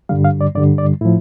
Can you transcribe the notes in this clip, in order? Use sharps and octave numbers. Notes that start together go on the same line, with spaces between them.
G2 D3 G3 F5
F5
D5
G2 D3 G3 D5
D5
A2 F3 E4